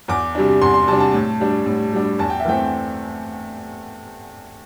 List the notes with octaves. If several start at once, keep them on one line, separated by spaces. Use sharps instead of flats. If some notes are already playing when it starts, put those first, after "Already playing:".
E2 D6
C3 G3 D4
E2 C6
C6
C3 G3 D4 A5
A5
A2
G3 D4
A2
G3 D4
E2 A5
G5
E5
E3 A3 C4 G5